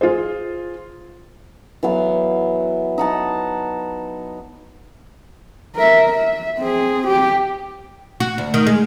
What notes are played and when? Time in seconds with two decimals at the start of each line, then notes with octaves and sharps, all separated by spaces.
0.01 F4 G#4 C5
1.83 E3 F#3 B3 F5
2.98 D#4 F#5 A5
5.76 A#4 E5
6.09 E5
6.58 C4 G#4
7.07 G4
8.20 F#4
8.38 D2
8.54 D#3
8.67 G#3